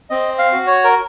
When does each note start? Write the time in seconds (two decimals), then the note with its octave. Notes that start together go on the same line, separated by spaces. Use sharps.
0.10 C4 D#5
0.38 F5
0.52 F#4
0.67 C#5
0.84 A#4